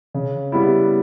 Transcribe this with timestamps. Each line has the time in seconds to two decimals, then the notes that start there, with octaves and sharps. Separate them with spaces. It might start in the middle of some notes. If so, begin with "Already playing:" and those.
0.14 C#3
0.52 G3 B3 E4